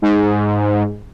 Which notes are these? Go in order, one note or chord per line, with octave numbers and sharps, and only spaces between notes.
G#2